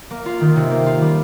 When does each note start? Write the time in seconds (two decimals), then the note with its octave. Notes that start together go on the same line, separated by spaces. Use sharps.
0.10 A#3
0.26 F4
0.41 D#3
0.56 C3
0.71 A#3
0.86 F4
1.02 G3